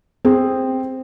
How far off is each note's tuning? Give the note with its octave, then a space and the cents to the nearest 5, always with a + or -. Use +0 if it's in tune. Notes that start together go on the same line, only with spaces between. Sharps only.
C4 +0 G#4 -15